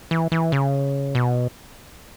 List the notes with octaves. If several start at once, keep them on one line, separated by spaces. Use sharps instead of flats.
E3
E3
C#3
B2